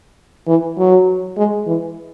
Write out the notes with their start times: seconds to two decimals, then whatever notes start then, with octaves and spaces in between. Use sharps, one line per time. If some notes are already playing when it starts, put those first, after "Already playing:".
0.48 E3
0.78 F#3
1.37 G#3
1.67 E3